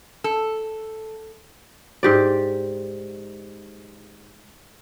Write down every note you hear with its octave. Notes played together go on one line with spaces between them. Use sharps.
A4
G#2 G4 D5